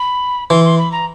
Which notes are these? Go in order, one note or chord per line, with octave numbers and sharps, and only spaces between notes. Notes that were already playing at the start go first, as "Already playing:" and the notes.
Already playing: B5
E3 C6
C6
B5
A#5